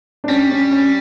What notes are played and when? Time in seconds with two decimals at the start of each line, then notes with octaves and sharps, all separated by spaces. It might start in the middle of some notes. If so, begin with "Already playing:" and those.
0.24 D4
0.29 G3 C#4
0.50 C#4
0.71 C#4